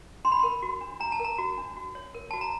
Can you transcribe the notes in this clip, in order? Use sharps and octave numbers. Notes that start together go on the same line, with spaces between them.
D4 C6
B5
A#4 C6
F#4
D4
D4 A#5
A5
A#4
A#5
F#4
D4
F#4
C#5
A#4
F#4 A5
A#5